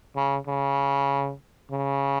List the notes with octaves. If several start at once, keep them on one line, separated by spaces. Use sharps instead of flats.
C#3
C#3
C#3